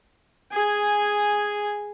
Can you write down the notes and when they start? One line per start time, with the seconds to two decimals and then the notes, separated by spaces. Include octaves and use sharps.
0.52 G#4 G#5